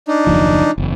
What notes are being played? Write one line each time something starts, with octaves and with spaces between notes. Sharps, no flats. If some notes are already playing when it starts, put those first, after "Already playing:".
D4 D#4
F#1 D#2 F3
F#1 E2